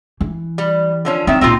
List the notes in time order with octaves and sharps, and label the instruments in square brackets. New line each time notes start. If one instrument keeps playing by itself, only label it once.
[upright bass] E3
[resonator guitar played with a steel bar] G3
D3 F3 C#4
[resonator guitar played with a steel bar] D#3 E5 [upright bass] C4
[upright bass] C#2 A#2 [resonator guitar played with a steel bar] C4 D#4 F4